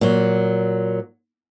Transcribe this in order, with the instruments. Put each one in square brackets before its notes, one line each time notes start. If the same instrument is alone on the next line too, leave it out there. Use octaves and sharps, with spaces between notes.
[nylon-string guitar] A#2 F#3